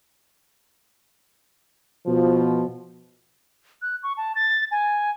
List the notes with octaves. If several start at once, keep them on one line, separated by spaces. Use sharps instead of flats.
B2 F3
F#6
C#6
A5
A6
G#5